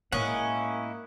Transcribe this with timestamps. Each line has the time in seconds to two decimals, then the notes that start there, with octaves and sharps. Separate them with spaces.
0.12 A2 G#3 A#3 C#4 E4 D#5 F#5